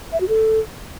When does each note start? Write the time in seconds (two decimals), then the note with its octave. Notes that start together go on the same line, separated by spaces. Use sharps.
0.13 E5
0.21 F#4
0.29 A4